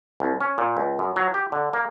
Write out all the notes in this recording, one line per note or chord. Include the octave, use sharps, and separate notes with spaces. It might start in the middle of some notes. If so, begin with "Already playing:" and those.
C2
C#4
A#2
C#2
F#2
F#3
G4
D3
A#3